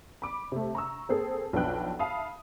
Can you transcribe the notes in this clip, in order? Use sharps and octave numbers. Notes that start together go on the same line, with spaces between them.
B5 D6
C3 A3
A#5 C#6 E6
A#3 C4 G#4 A4
B1 F2 D4 B4 G5 F#6
E5 F5 A5 B5 D#6